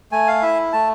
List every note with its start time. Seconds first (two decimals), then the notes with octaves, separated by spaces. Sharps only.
0.12 A3 G#5
0.28 F5
0.42 E4 E5
0.73 A3 A5